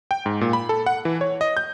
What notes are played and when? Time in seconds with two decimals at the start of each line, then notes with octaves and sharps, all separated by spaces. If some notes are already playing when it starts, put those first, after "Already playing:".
0.11 G5
0.26 G#2
0.41 A#2
0.53 B5
0.69 A4
0.86 F#5
1.05 E3
1.21 C#5
1.41 D#5
1.57 G6